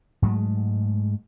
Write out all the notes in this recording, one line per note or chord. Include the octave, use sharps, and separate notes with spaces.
G#2 F#3 G#3 A3